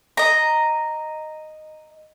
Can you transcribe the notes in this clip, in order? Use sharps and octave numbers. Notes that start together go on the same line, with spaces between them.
D#5 A#5